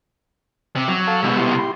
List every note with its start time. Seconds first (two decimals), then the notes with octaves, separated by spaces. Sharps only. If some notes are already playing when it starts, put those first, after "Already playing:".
0.76 C3
0.88 F#3
1.07 A4 F5 A5
1.23 C2 B2 G#3 E6
1.38 E4 G4 C6